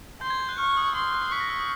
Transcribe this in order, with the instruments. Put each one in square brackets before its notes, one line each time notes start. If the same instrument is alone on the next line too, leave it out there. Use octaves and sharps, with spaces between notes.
[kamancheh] C6 [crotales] G6
[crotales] G#6
G6
F#6
[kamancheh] C#6 [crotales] F6
[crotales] D#6
E6
[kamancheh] C6 [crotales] D#6
[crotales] E6
F#6
C7
[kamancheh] C#6 [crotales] B6
[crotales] A#6
E6
D#6